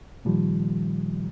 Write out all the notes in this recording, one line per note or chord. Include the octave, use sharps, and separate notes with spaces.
A#2 D#3 F3 G3